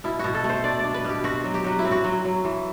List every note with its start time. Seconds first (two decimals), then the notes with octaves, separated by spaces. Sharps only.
0.04 B2 E4
0.19 B2 F#4
0.34 A4
0.44 A3
0.49 C5
0.64 D4 D5
0.79 D4 D5
0.94 B4
1.05 B2 G4
1.24 C4 F#4
1.44 F#3
1.54 G4
1.64 F#3 F#4
1.79 E4
1.84 C4
1.91 F#4
2.04 F#3
2.25 F#3
2.45 E3